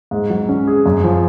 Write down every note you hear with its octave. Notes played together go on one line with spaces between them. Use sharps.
G#2
F#3
C#4
G#4
F#2
F3